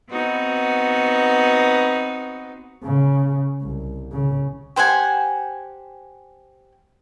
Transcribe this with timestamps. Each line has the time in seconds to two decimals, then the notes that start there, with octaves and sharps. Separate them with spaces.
0.10 B3 C4 D#4 F#4 B4
2.84 C#3
3.62 C2
4.12 C#3
4.76 G4 C5 F#5 G#5